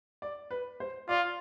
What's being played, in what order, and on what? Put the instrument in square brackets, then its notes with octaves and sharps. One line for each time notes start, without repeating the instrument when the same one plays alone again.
[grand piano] D5
B4
C5
[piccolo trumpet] F4 [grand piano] D5